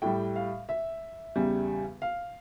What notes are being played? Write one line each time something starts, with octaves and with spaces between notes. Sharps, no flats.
A2 G3 G5
F5
E5
E2 C#3 G3
F5